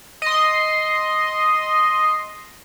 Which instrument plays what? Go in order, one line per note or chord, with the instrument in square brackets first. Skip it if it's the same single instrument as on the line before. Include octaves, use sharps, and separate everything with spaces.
[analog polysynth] D#5 C6